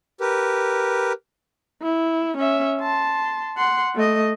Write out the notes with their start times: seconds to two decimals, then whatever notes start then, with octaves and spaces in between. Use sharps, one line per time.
0.20 G4 A#4 B4
1.83 E4
2.38 C#4 E5
2.81 A5 C6
3.58 F#5 C6
3.95 A3 D#5